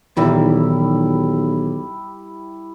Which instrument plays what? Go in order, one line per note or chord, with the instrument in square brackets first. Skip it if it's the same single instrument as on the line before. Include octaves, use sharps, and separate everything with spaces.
[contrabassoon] B1 [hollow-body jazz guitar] A#2 D#3 E3 [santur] G3 E4